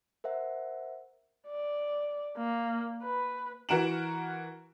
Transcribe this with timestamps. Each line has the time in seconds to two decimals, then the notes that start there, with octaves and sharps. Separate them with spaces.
0.24 A#4 C5 E5 F#5
1.48 D5
2.38 A#3
3.03 B4
3.69 E3 F#4 A#4 D7 E7 F#7